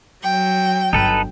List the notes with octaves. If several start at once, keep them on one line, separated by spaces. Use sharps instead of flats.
F#3 G5
G1 D#4 A4 B4